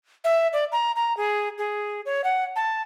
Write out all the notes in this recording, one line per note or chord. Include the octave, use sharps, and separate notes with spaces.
E5
D5
A#5
A#5
G#4
G#4
C#5
F#5
A5